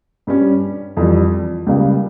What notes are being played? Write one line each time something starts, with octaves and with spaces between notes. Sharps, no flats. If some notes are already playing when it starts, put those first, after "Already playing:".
G2 G3 C#4
F2 E3 G3
C#2 C#3 G3 A#3